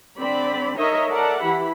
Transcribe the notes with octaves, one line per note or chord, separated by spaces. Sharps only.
D3 C4 D5 B5
D#4 A#4 C#5 D#5 E5
A4 A#4 D5 E5 F#5 A5
E3 E4 G4 B5